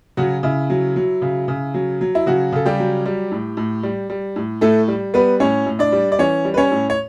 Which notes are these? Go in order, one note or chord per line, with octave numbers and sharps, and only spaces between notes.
C#3 F#3 F#4
C#3 E4
F#3
F#3
C#3
C#3
F#3
F#3
E4
C#3 F#3 F#4
C#3 A4
G3 G4
F#3
G3
A2
A2
G3
G3
A2
A2 A3 A4
G3
G3 B3 B4
A2 C#4 C#5
A2
D4 D5
G3
D5
E3 C#4 C#5
G3
B4
C#4 C#5
A2
C#5